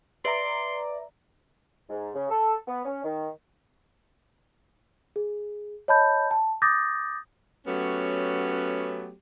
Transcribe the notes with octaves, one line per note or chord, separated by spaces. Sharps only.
B4 D5 E5 A#5 C6
G#2
C#3
A4
B3
C#4
D#3
G#4
C#5 D#5 A5 B5 G6
A5
D6 D#6 G6 A6 A#6
F#3 A3 B3 C#4 G4